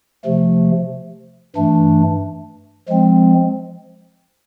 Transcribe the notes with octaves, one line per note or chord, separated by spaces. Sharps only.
C3 F3 A3
G2 E3 A3 D4
F3 G#3 C4